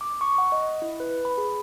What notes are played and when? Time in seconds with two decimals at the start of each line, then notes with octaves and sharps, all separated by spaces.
0.01 D6
0.21 C#6
0.38 F#5
0.52 D#5
0.82 E4
1.00 B4
1.25 B5
1.38 G#4